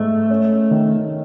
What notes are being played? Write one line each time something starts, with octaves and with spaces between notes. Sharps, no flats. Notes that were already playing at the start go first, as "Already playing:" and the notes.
Already playing: G#2 A3
C#4
D#3